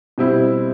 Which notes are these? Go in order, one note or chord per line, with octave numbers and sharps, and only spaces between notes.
B2 G3 C4 E4